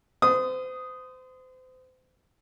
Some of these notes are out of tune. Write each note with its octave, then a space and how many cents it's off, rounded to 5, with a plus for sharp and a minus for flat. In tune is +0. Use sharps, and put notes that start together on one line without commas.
C5 -35 D#6 +0